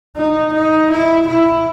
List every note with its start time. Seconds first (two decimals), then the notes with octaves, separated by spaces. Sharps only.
0.17 D#4
0.53 D#4
0.91 E4
1.28 E4